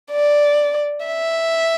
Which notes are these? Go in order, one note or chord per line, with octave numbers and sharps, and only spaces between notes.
D5
E5